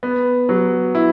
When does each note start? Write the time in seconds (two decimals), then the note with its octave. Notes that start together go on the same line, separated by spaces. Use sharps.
0.03 B3
0.49 F#3
0.95 E4